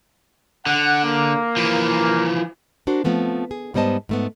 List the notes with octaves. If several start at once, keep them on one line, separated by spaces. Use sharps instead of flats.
D3 F#5
A#3
E3 F3
D4 F#4 A#4 C5
F3 A3 B3 C4
G#4
G#2 G3 B3 C5 D#5 A5
G#2 A3 B3